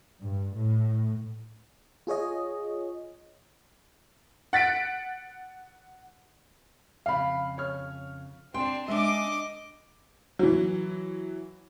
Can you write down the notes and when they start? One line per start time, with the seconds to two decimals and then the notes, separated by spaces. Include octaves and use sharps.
0.21 G2
0.55 A2
2.07 F4 G#4 C#5 D#5
4.53 F#5 A6 B6 D7
7.06 F2 C#3 F5 B5
7.58 C#5 F6
8.54 C4 D4 G5 C6
8.88 G#3 D4 D#5 E5 D6
10.39 E3 F#3